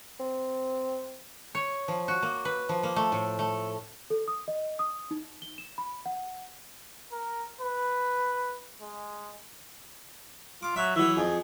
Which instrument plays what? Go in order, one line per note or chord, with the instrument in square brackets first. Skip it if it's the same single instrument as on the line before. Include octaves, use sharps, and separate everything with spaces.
[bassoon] C4
[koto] C#5
F3
F#4
A#3
B4
F3
A#3
A3
A2
A3
[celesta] A4
D#6
D#5
D#6
D#4
G7
E7
B5
F#5
[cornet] A#4
B4
G#3
[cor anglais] F4 [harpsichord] D6
[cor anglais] F#3 [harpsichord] E5
[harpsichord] E3 F#3 [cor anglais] E5
[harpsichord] F2 [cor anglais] G#4